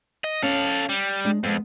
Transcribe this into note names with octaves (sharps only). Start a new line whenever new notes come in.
D#5
C#4 A4 F5
G3
G#3 D4
F2 G#3 B3